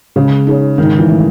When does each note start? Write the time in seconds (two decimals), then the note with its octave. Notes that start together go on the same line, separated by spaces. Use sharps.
0.16 C#3 G#3
0.47 D#4 G#4 C#5
0.78 G#2 D#3
0.98 E3
1.09 D#3 A3 C#4 E4